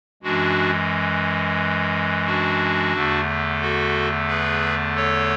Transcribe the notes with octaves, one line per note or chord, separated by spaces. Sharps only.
F#2 E3 G#3 D4 F#4
D4 F#4
E2 D3 A3
F#4 A4
G#4 B4
A4 C#5